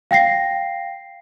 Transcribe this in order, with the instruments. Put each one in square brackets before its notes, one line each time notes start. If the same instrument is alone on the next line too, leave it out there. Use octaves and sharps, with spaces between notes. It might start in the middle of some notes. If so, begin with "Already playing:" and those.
[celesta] F5 G5 A#6 C7